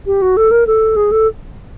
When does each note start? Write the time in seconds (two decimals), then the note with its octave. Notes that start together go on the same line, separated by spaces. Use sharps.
0.06 G4
0.22 F#4
0.37 A4
0.51 A#4
0.67 A4
0.96 G#4
1.12 A4